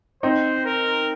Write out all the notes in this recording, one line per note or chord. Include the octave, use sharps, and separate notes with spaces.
C4 D#4 C5
A#4